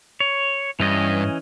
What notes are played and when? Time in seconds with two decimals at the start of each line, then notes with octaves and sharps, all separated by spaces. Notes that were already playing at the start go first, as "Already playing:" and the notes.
0.20 C#5
0.80 G2 E3 C#4 D#5